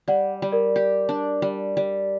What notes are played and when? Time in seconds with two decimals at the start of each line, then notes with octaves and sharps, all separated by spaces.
0.08 G3 D5 F#5
0.42 G3
0.52 A#4 D5
0.76 G4
1.09 D4
1.42 G3
1.77 G3